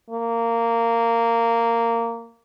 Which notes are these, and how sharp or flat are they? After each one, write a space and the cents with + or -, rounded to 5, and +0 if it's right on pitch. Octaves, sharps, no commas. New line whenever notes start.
A#3 -15